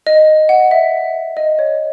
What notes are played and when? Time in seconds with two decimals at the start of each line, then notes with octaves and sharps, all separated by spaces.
0.07 D#5
0.49 F#5
0.71 E5
1.37 D#5
1.59 C#5